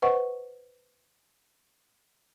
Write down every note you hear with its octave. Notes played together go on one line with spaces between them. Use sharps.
B4 C5 D#5 F#5 C#6